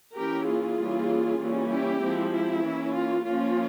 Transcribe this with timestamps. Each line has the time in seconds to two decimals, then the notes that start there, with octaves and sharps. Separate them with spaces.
0.16 E3 A#3 C#4 G4 A#4
0.48 F4 G#4
0.78 E3 G3 A#3 C#4
1.40 E3 G3 A#3 C#4
1.71 E4 G4
2.01 F3 G#3 C4
2.32 E4
2.63 E3 A#3 C#4
2.94 F4
3.25 F3 A#3 C#4 F4